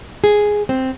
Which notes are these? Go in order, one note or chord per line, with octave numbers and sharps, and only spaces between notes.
G#4
C4